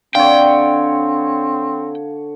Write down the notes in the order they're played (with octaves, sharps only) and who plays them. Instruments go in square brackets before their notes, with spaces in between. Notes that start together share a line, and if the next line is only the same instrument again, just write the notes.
[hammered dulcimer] D3 C#5 [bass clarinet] C4 [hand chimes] F5 [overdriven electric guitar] G5